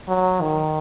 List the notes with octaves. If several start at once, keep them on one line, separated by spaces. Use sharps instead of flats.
F#3
D#3